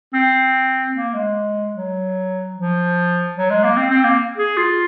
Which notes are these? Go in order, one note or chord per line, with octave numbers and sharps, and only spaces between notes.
C4
A#3
G#3
F#3
F3
F#3
G#3
A#3
C4
C4
A#3
G#4
F4